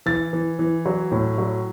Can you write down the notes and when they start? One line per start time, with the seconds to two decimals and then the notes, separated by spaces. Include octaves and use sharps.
0.06 E3 A6
0.33 E3
0.59 E3
0.86 F#3
1.12 A2
1.38 F#3